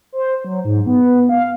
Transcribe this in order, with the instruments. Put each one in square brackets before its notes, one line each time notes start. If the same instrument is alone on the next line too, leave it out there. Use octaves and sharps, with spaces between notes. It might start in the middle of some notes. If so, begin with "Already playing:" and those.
[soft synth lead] C5
F#3
G#2
B3
F5